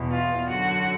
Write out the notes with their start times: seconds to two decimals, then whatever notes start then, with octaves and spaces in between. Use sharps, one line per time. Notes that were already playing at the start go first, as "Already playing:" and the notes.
Already playing: E2 B2
0.11 F4
0.49 F#2 D3 F#4